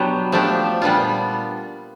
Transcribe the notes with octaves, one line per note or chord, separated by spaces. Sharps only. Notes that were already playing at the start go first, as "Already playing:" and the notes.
Already playing: B2 F#3 B3 D4 G4
F3 A3 D4 G4
A#2 G3 B3 D4 F4